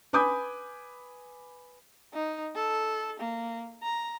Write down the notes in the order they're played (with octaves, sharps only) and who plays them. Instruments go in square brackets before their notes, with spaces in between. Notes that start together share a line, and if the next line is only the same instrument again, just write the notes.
[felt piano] B4 G#5 B5 D6 D#6 G6
[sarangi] D#4
A4
A#3
A#5